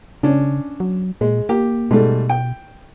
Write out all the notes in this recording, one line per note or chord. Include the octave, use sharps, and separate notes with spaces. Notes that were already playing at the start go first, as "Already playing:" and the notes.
C#3 C#4 D4
F#3
A#2 G#3
A#3 G4
G#2 B2 G3 A3
G5